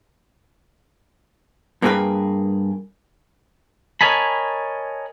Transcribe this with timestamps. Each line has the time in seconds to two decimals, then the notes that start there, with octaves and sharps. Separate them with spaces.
1.82 G2 A#3 C4 G#4 B4 G5
4.01 A#4 C#5 D#5 G#5 A5 B5